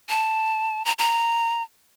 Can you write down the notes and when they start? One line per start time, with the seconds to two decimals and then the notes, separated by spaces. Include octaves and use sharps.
0.09 A5
0.85 A#5
0.99 A#5